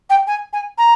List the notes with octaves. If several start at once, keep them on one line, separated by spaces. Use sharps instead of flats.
G5
G#5
G#5
A#5